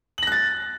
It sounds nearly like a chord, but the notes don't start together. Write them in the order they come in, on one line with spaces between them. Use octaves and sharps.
F#7 A#6 F#6 A6